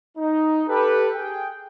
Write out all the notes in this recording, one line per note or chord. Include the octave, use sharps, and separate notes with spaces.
D#4
G4 A4 B4
G#4 G5